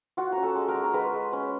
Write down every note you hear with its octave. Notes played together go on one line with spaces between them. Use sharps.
F4 F#4 F#5
C#4 A#5
A4 A5
G#3
A#4 A#5
G#3
A#5
G#3 B4 B5
G#3
C#4